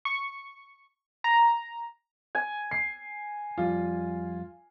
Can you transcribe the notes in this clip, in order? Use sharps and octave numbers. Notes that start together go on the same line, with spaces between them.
C#6
A#5
G#5
C7
F2 G3 F4